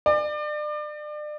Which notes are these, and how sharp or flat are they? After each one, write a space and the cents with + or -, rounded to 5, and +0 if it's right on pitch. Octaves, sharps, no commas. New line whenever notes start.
D5 +35